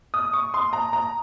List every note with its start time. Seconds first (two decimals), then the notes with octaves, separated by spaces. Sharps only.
0.14 D#6
0.33 C#6
0.54 C6
0.73 A#5
0.93 A#5